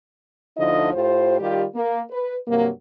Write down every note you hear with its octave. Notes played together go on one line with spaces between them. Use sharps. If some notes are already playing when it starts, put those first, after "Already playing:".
D2 D3 F3 D#4 E4 D#5
A2 F4 G4 C5
D#3 G3 F4 G4
A#3
B4
G2 C3 F#3 A#3